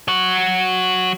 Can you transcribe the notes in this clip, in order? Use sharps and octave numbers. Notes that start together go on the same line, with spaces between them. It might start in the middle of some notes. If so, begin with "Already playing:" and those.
F#3 F#4